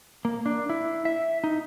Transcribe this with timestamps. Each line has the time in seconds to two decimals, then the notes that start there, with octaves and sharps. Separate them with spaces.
0.25 A#3
0.46 D4
0.70 E4
1.05 E5
1.44 D#4